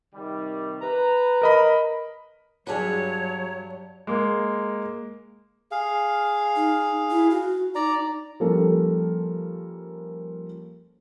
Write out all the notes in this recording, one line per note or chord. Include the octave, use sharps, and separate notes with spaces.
C3 D#3 G3
B4 A#5
A#4 D#5 B5
G2 F#3 D4 F#4 G#4 B4 C#5
G#3 A#3
G#4 F5
D#4
E4
F#4
D#4 D5 A#5
F3 G3 A#3 C#4 A4 A#4